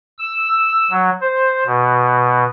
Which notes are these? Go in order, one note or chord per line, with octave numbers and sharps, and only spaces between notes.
E6
F#3
C5
B2